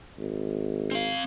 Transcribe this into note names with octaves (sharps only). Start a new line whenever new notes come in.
G#1
C4 F5